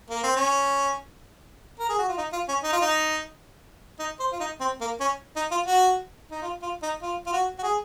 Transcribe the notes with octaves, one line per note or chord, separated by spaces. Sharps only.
A#3
C4
C#4
A#4
G#4
F#4
F4
D#4
F4
C#4
D#4
F4
D#4
D#4
C5
F4
D#4
C4
A#3
C#4
D#4
F4
F#4
D#4
F4
F4
D#4
F4
F4
F#4
F#4
G#4